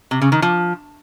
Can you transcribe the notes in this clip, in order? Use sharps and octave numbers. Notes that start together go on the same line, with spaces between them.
C3
C#3
D#3
F3